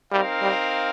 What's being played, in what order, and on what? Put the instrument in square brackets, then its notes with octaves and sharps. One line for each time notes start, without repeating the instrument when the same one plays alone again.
[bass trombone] G3 [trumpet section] C4 D#4 A#4 F5
[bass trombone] G3